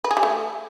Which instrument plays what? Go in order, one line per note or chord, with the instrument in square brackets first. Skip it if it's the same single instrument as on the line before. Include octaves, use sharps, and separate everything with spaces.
[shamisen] B4
G#4
G3
A3